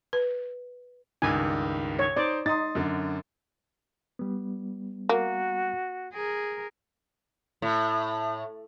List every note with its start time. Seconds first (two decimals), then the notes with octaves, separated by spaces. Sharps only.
0.13 B4
1.22 C#2 G2 D#3 G#5
1.99 C#5
2.16 D#4 C5 D5
2.46 D#4 C6 D#6 A6
2.75 F#2 D3
4.19 G3 B3
5.09 A#3 F#4
6.13 G#4 A#4
7.62 A2